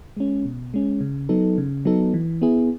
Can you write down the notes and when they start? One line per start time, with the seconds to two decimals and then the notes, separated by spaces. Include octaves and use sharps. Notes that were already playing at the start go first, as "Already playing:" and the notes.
0.17 G#3 C#4
0.45 B2
0.74 G#3 C#4
1.01 C#3
1.29 F#3 B3 D#4 A4
1.58 C#3
1.85 F#3 B3 D#4 A4
2.14 E3
2.42 B3 E4 G#4